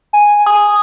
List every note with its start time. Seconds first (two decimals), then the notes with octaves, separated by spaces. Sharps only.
0.13 G#5
0.46 D#6